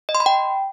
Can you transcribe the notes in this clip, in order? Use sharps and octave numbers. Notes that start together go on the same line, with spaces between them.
D#5
C6
B5
G5